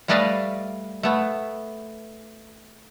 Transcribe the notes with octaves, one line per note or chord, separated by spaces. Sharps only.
G3 A3 B4 D5 D#5 F5
A3 B3